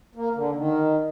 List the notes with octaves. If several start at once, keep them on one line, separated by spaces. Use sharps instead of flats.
A#3
D3
D#3